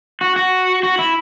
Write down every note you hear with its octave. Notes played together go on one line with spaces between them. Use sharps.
F#4
F#4
F#4
E4